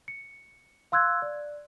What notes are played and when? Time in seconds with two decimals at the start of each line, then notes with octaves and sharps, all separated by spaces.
0.08 C#7
0.92 F5 C6 E6 F#6 G#6
1.22 D5